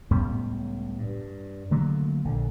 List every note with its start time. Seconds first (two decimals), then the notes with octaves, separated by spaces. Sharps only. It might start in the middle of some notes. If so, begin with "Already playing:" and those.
0.11 C#2 A2 G3 B3
0.98 G2
1.71 D3 F#3 A3 A#3
2.25 A#1 D3